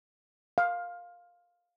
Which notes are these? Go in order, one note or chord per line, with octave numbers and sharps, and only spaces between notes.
F5